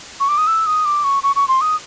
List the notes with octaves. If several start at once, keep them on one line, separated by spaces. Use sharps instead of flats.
C#6
D6
D#6
E6
D#6
D6
C#6
C#6
C#6
C6
D#6